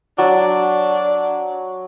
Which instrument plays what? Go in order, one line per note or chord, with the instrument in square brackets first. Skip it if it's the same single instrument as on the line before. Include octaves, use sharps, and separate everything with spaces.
[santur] F#3 [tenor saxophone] D4